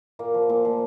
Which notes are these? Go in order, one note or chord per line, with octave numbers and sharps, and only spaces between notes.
A#2 A#3
F3
A#2
F3